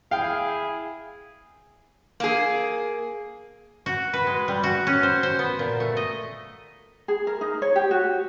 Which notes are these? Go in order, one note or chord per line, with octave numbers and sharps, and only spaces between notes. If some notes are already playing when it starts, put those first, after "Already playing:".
E4 G#4 F5 G5
A#3 G#4
F#4
B4
G#3
G3
F#4
C#4
C5
C5
B3
A#2
A3
D#5
G#4
A#4
D#4
C#5
G4
F#4